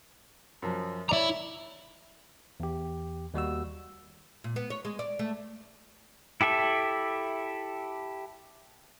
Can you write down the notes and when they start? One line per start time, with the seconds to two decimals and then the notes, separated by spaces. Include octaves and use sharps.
0.62 F#2 F3
1.09 E4 C#5 D5 A#5 D6
2.60 E2 G4
3.34 D#2 G3 F#4 E6
4.44 A#2
4.56 B3
4.70 C#5
4.85 G#3
4.99 D5
5.19 A3
6.41 E4 G4 A4 E5